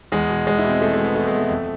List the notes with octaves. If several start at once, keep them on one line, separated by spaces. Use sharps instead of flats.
E2 G#3
B2
E2 G#3
E4
B2
C4
E2 A3
G#3
B2 B3
E2 A3
G#3
B2
A3
F2